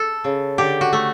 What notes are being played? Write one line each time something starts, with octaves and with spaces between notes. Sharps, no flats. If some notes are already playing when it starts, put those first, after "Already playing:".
Already playing: A4
C#3
D3 G4
F#4
A3